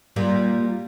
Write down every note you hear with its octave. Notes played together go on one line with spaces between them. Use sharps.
A#2 G3 A#3